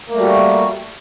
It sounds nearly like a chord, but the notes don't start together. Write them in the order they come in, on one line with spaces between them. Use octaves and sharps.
A#3 A3 G3 F#4